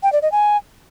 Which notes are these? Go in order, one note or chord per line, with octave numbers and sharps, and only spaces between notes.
G5
D5
D#5
G#5